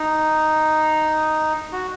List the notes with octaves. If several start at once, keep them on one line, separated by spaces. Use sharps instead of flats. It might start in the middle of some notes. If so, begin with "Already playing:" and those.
Already playing: D#4
F#4